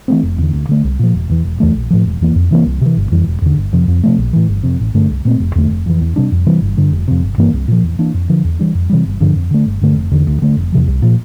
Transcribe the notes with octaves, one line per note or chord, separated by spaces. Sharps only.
E3 A3 C4
F1
E2 D3
D2
D3 A3
C2
A#2 F3
E1
E2 E3
E1
E2 E3 A3
A#1
A2 F3
E1
E2 E3 A#3
F2
C3 E3 A#3
C2
C3 E3
G1
F2 E3 G3
E1
E2 D3
G1
F2 C3 F3
F2
C3 F3 A3
A#1
A2 E3
G1
F2 C3
A1
G2 D3 A3
C2
A#2 A3 C4
F1
E2 D3 A3
F1
F2 E3
E2
C3 G3 D4
F2
C3 E3 G3
G1
G2 D3
F1
F2 C3
G1
G2 E3 A#3
C2
A#2 F3
E2
E3 A#3 D4
F2
D3 F3
E2
E3 G3 D4
F2
C3 E3 G3
G1
G2 D3 F3
F2
D3 A3
G1
G2 D3 A3
F1
E2 D3
D2
D3 A3
F1
E2 C3 F3
C2
A#2 F3